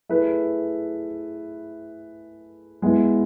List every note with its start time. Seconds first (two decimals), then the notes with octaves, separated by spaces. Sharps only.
0.09 A3 E4 G#4 B4
2.82 G#3 B3 E4